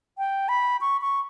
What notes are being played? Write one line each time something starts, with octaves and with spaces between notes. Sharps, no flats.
G5
B5
C#6
C#6